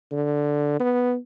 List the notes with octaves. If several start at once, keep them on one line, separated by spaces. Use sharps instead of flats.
D3
B3